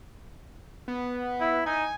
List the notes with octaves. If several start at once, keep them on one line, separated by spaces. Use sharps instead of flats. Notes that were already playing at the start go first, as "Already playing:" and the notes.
B3
E4
D#4 G#5